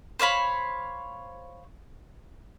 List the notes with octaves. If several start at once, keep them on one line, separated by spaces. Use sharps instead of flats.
C5 C#5 F5 B5